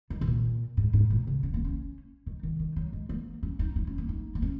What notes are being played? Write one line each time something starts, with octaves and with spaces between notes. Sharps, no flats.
D#3
G#2
A#2
G#2
G#2
A#2
C#3
C#4
A#3
C#4
D#3
D#3
D#3
F#3
G#3
A#3
C#4
D#4
D#4
C#4
A#3
D#4
A#3
C#4